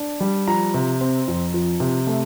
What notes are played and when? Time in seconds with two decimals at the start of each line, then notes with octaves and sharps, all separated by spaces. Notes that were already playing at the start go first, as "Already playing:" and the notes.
Already playing: D4
0.21 G3
0.47 F3 A#5
0.74 C3
1.01 C4
1.28 F2
1.54 F3
1.80 C3
2.07 A3